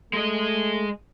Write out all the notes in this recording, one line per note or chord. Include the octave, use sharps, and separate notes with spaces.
G#3 A3 D#5